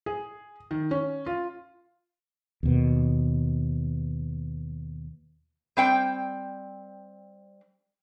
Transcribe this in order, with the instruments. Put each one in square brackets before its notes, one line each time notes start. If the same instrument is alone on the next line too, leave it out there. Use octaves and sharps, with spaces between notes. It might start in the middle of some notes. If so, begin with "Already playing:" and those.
[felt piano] G#4
D#3
C#4
F4
[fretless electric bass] D#2 B2
[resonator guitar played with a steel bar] G3 C4 G5